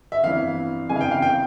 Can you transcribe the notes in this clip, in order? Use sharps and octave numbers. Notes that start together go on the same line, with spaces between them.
E5
G1 F2 E3 F5
G1 F2 C#3 E3 G#5
F5
G5
F5
G5